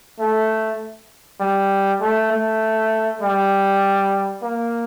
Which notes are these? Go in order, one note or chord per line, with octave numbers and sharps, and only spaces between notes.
A3
G3
A3
A3
G3
A#3